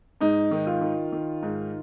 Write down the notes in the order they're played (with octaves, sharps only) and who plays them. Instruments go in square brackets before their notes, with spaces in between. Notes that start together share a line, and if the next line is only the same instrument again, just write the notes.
[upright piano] G#2 D#4
D#3
F4
D#3
D#3
G#2